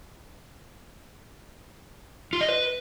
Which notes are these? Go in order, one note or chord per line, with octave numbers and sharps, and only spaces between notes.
F4
D#5
B4